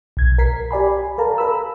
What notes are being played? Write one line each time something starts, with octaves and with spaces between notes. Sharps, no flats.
B1 G#6
A#4 B6 C7
G4 D5 G#5 B5
A4 A#4 F5 A5 A#5
A#4 B5 E6